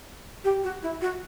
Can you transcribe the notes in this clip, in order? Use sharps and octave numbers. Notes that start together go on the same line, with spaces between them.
G4
F#4
E4
F#4